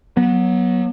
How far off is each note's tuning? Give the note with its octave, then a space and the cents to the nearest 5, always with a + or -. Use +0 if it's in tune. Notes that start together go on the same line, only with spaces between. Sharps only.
F#3 +0 B3 -30